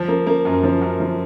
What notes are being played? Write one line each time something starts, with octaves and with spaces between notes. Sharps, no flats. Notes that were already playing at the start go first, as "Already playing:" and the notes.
Already playing: F3
A#3
A#3
F#2
F3
F#2
F3